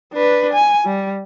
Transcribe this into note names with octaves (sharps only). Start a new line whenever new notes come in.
D4 B4
G#5
G3